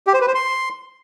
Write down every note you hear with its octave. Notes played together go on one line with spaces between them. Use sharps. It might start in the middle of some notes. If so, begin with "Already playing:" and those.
G4
C5
B4
C5
C6